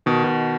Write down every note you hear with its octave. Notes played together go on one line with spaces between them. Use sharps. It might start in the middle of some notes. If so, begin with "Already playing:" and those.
B2 D#3
B2